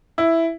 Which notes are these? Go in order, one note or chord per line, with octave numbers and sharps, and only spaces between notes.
E4